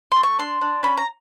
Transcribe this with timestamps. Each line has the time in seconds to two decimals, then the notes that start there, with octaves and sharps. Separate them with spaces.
0.12 A3 C6
0.23 C#6
0.39 D4 C6
0.61 D4
0.83 C#4 B5
0.97 A#5